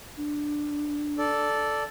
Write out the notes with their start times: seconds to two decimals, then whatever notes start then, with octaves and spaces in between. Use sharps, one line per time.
0.17 D4
1.18 A4 D5